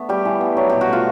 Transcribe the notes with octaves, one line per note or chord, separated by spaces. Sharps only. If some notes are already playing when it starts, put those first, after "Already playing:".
Already playing: A3 B3 D4
G3 G4
E3
B3
F#3
B2 G4
F#4
A3 F4